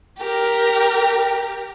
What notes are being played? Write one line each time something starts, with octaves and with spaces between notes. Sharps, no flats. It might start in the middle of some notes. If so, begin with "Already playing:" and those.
G4 A#4